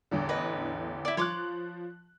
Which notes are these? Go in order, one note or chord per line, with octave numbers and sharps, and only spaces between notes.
A1 E2 D3
B4 D#5
E4 D5
F3 C#5 C6 D6 F#6